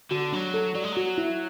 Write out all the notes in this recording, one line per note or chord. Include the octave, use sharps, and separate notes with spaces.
D3 F#4
F#3 D4
A4
F#3 D5
G#3
F#3 F#4
E4